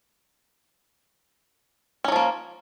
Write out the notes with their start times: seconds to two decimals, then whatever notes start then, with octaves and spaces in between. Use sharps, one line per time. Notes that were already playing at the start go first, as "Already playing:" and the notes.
2.04 C#4
2.08 F#3
2.12 F3
2.16 A#3